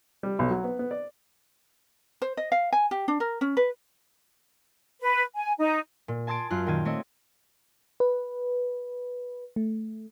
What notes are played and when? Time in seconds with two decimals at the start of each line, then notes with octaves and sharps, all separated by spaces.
0.23 G3
0.39 B1
0.51 F#3
0.64 B3
0.79 B3
0.91 D5
2.22 C5
2.37 D#5
2.52 F5
2.73 G#5
2.91 G4
3.08 D4
3.20 A#4
3.41 C#4
3.57 B4
5.01 B4
5.35 G#5
5.58 D#4
6.08 A#2
6.27 G#5 A5 C6 D#6 A6 D7
6.50 F#2 F4 C6 F#6
6.66 A#2 D#3 G5 A5 G#6 D#7
6.85 A3 C4 C#5 D#5
8.00 B4
9.56 A3